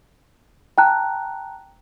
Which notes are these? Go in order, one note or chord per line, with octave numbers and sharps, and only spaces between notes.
G5 A5 A#5 F#6